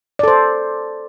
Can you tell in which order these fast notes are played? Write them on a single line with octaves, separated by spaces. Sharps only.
D5 A4 C5